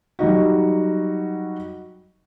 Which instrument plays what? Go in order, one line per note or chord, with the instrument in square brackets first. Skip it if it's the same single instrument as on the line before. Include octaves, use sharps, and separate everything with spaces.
[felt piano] F#3 G3 D#4 F#4